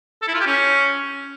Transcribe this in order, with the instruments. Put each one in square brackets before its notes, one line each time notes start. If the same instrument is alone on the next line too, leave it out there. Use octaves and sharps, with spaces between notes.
[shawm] A4
E4
F4
G4
C#4